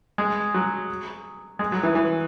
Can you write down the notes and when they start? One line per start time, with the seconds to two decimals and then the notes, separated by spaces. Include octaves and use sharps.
0.18 G#3
0.54 F#3
1.59 G#3
1.72 F#3
1.83 E3
1.95 E3